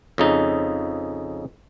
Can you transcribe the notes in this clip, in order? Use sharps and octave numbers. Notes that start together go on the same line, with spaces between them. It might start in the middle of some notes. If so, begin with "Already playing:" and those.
F2 C#3 D#4